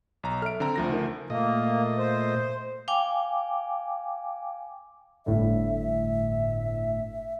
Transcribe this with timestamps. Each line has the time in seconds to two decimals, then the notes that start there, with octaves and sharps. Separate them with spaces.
0.23 B1 A#5
0.42 A4 E5 F6 D7
0.60 D3 C4 A#5
0.76 D2 F3 A#6
0.90 C#3 D#4 A#4
1.30 A#2 A3 A#3 D#5
1.98 C5
2.88 F5 G5 G#5 D6
5.26 G1 A2 D3 E5